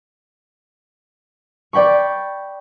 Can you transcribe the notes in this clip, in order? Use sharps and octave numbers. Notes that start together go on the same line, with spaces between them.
D5 G5 B5 C#6